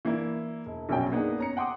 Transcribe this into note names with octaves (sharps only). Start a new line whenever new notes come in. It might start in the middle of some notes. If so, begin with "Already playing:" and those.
E3 A#3 D4 E4
E1
A#1 F#2 B2 C#4 G5
A#3 B3 D4 D#4 G#4
C#4 A#5 C#7
F#5 G5 C6 D6 D#6